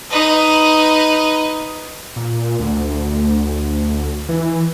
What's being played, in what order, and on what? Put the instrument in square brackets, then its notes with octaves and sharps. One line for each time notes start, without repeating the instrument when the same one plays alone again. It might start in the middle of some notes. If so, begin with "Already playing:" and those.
[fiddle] D#4 B4
[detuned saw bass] A#2
D2
E3